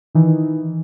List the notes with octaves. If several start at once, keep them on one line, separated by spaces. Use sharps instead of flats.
D#3 E3 D#4